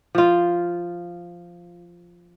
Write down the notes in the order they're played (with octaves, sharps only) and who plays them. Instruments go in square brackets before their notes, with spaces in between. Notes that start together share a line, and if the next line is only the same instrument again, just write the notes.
[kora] F3 F4